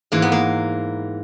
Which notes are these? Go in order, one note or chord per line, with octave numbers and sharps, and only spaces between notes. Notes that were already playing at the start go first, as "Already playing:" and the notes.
G#2 E3 A#3
B3
A#3